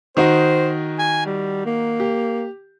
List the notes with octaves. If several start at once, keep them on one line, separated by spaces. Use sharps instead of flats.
D#3 D#4 F#4 C5
G#5
G3
A#3
G4